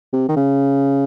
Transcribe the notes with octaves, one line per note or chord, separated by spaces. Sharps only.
C3
D#3
C#3